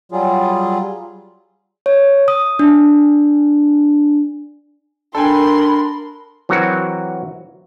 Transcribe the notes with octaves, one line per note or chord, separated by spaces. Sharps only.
F#3 G3 F4 G#4
C#5
D#6
D4
D4 A4 A#4 G5 G#5 B5 C6
E3 F#3 C4 F#4 A#4